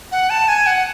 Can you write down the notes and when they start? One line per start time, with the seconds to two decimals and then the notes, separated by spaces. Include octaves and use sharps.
0.12 F#5
0.30 A5
0.48 G#5
0.67 F#5